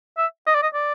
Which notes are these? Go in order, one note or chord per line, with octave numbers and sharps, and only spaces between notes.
E5
D#5
D5
D#5
D5